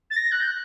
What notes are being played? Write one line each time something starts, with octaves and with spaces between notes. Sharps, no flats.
A6
A#6
F#6
G6
F#6